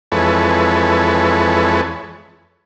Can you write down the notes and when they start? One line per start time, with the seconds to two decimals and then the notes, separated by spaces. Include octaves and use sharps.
0.12 F2 E3 G#3 A4 B4 C#5